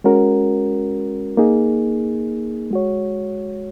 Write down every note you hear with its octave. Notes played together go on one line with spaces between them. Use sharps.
G#3 C#4 F#4 A#4
A#3 D#4 G#4
G#3 F#4 C#5